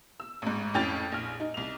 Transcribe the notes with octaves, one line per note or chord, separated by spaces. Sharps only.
E6
A1 G#2
F2 A2 C#4 G5 A6 F7
A#1 F6
D#4
C2 F7